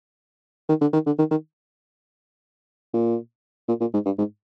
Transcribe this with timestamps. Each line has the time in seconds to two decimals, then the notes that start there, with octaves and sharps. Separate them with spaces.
0.69 D#3
0.81 D3
0.93 D#3
1.06 D3
1.18 D#3
1.31 D#3
2.94 A#2
3.68 A#2
3.80 A#2
3.94 G#2
4.05 G2
4.18 G#2